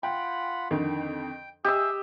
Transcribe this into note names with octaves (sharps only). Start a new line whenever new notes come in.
F4 F#5 G5 B5
F2 D3 D#3 G5
G4 G#4 D#5 E5 D#6 E6